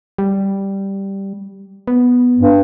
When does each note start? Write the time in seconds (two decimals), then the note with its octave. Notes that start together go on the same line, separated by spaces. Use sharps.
0.18 G3
1.87 B3
2.37 G2